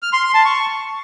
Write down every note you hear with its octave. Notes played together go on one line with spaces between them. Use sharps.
F6
C6
C6
A5
C#6